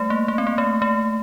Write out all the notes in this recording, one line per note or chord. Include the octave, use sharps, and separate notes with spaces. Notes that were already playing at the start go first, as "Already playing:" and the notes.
Already playing: G3 A3
A#3
A#3
C4
A#3
A3
A3